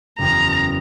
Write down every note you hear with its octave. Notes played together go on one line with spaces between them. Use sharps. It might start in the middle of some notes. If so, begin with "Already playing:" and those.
F#1 E2 A#5